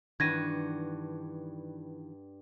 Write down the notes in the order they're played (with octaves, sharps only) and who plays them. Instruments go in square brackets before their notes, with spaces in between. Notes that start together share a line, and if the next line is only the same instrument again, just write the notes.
[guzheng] G2 D4 F#4 [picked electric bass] D#3 E3 [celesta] G#6 A#6 D#7